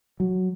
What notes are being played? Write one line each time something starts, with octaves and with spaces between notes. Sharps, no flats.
F#3